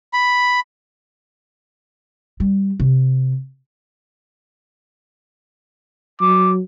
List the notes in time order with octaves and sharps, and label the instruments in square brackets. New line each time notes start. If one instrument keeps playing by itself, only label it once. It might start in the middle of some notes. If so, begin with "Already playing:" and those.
[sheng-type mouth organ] B5
[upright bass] G3
C3
[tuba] F#3 [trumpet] D6